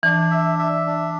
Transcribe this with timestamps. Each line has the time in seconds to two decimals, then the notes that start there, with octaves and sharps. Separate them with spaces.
0.03 E3 D4
0.31 E5
0.59 E5
0.86 D4